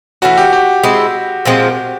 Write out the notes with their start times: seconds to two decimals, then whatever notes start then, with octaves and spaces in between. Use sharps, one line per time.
0.22 E3 A3 C#4 F#4
0.37 G4
0.53 G4
0.83 G#3 C4 E4
1.45 A#2 F3 G#3 C4